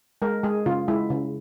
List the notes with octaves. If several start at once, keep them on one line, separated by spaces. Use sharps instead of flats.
G#3 A#4
G#3 G#4
C#3 F4
G#3 E4
C#3